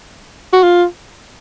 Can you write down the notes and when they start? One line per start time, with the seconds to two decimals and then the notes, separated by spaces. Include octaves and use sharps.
0.53 F#4
0.63 F4